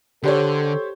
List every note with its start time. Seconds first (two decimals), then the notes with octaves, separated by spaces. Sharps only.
0.23 D3 G4 A4 C5 C#5